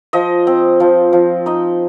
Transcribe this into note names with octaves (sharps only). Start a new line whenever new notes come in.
F3 D#5
C4
F3
F3
D#4 D#5